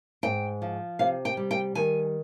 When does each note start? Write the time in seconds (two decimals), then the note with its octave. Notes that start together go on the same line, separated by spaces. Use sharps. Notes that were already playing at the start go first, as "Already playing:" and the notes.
0.23 G#2 G5
0.62 F3
0.99 C3 F5
1.25 G5
1.37 G3
1.51 G5
1.75 D#3 G#5